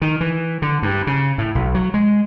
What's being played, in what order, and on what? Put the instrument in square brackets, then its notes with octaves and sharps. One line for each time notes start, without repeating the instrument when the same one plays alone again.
[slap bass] D#3
E3
D3
G2
C#3
A2
B1
F#3
G#3